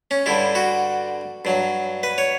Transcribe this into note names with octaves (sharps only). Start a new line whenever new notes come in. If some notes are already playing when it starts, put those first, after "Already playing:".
C#4
G2 D3 G3 E4
F#4
G2 F#3
B4
C#5